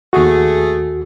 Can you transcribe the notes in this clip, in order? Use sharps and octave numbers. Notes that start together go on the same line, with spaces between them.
D#2 A3 F#4 G#4